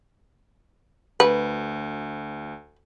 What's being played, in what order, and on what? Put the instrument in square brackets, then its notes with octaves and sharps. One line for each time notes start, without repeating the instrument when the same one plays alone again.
[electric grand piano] D2 [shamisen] B4